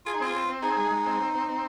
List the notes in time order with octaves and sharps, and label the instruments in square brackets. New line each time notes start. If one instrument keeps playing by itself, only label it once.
[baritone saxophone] F4 [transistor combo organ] G#4
[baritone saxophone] D#4
[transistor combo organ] C4 [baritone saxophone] F4
[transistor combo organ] C4
C4
[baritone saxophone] D#4 [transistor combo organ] G#4
[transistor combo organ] G#3
G#3
C4
C4
C4
C4